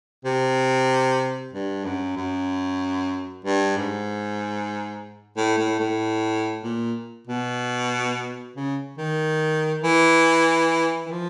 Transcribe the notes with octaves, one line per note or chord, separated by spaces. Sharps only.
C3
G2
F#2
F#2
G2
G#2
A2
A2
A2
A#2
B2
C#3
D#3
E3
E3
F3